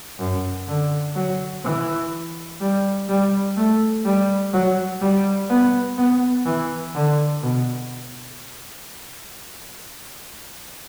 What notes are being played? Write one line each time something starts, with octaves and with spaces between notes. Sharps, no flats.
F#2
D3
F#3
E3
G3
G3
A3
G3
F#3
G3
B3
B3
E3
D3
B2